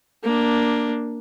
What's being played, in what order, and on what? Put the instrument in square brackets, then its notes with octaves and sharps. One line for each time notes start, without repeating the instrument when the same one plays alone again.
[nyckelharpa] A#3 D4